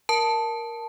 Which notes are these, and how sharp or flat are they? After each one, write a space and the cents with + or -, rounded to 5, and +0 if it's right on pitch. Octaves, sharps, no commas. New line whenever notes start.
A#4 +5 A5 +0